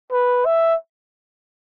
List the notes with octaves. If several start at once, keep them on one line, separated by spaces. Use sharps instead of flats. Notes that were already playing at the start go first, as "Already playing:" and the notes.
B4
E5